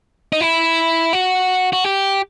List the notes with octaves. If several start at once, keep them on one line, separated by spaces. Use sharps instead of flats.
D#4
E4
F#4
F#4
G4